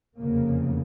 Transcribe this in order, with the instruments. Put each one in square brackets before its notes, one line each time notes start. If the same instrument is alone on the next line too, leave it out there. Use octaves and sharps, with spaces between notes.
[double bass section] F1 E2 C#3 A#3